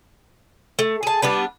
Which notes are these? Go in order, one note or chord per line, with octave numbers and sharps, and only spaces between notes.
A3
G#4 A5
G3 B3 D4 B4